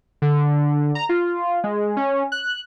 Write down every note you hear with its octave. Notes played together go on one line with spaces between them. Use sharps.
D3
A#5
F4
G#3
C#4
F#6